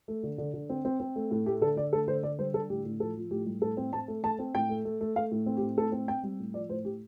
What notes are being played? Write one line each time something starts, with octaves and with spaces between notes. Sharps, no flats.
A3
D3
D3
D3
C4
C4
C4
A3
A2
A3 G4
D3 A4
D3 D5
A3 A4
D3 C5
D3 D5
G3 C5
D3 A4
A2 G4
A2
F3 A4
F3
A2 G4
G3
A2 A4
C4
C4 A5
A3
A3 A5
C4
A2 G5
A3
A3
A3
A3 F5
A2
C4
G4
A2
A2 A4
C4
C4 G5
G3
A2
F3 D5
A2 C5
A2 G4